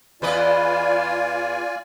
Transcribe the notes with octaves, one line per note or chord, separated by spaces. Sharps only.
E2 F4 B4 D5 D#5 G#5